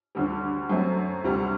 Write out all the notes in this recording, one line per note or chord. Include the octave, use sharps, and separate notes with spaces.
D2 D3 G3
F#2 F#3 A3 C4
D2 C3 G3